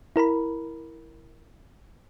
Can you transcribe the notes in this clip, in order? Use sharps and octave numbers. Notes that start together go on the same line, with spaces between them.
E4 A#4 A#5 B5